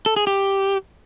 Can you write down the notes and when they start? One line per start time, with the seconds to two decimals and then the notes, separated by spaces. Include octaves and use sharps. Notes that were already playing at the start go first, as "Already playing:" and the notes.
0.06 A4
0.16 G#4
0.27 G4